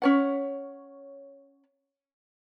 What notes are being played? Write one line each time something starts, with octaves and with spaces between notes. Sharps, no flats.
C#4 C#5 F#5